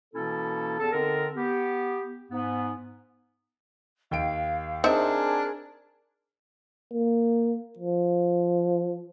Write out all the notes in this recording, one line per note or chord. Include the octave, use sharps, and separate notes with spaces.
B2 E3 A#3 C#4 E4 A4
E2 A4 A5
D3 C4 D#4 A4 A#4
B3 G4
G#2 B3
D#2 F5 G5 D7
C4 D4 D#4 G#4 A#4 C5 E5
A#3
F3